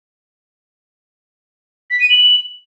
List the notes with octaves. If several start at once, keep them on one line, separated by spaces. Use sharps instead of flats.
B6
D#7
F#7